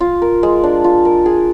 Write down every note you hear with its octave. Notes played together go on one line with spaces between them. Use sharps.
F4
A#4
G#3
D4
F4
A#4
G#4